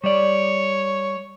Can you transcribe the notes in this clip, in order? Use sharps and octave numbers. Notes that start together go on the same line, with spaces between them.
G3 C#5 D5